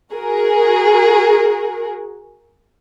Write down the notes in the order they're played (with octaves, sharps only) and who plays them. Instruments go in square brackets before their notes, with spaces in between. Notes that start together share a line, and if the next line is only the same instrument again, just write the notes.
[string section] F#4 G#4 A#4